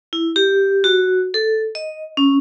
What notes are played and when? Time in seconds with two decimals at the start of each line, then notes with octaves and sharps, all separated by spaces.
0.13 E4
0.36 G4
0.84 F#4
1.34 A4
1.75 D#5
2.17 C#4